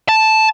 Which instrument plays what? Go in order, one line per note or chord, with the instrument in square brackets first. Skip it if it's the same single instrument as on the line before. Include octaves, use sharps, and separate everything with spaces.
[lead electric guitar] A5